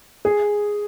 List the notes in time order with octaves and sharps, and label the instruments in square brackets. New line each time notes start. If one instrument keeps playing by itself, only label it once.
[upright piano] G#4